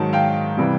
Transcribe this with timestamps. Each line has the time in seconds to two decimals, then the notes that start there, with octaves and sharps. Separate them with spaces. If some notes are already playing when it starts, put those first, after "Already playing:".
Already playing: G#2 D#3 F#3 A5
0.13 F5 G5
0.57 C3 E3 G3